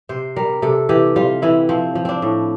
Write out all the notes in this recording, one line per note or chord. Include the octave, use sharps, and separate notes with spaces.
C3 C5
G3 A#4
C3 A4
E3 G4
G3 F4
E3 E4
F3 C4
F3
C4 D4
A2